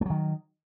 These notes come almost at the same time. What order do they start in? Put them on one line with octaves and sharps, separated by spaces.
A3 F#3 D#3